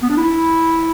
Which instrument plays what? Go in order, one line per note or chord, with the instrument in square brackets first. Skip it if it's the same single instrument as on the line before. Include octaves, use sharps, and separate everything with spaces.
[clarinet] B3
D4
E4